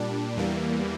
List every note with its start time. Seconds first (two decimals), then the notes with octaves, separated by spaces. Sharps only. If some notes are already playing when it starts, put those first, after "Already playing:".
Already playing: A#2 G3 D4
0.37 E2 E3 G3 A#3